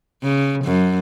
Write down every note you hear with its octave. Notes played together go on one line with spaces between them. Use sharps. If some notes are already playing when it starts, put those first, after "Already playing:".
C#3
F#2